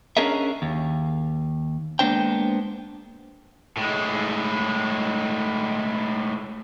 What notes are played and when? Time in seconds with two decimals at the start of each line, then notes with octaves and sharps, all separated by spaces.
0.17 C#4 D4 G#4 A#4 D#5 E5
0.62 D#2
1.99 G#3 A#3 B3 D4 C5 G5
3.77 A2 G#3